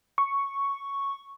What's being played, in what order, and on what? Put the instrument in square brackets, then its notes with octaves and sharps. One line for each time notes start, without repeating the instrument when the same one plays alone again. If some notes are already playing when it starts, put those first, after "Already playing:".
[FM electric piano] C#6